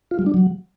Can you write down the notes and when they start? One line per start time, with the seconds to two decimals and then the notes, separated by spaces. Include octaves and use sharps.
0.11 F4
0.19 G3
0.26 D4
0.34 F#3